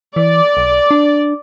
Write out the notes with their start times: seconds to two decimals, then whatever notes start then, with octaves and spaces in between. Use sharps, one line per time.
0.16 E3 D5
0.57 B1
0.91 D4